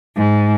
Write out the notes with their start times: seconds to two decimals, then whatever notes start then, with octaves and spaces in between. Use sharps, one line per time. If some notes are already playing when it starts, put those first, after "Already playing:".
0.16 G#2